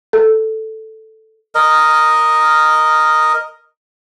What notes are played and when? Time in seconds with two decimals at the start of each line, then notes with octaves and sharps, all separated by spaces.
0.13 A4
1.55 A#4 D#5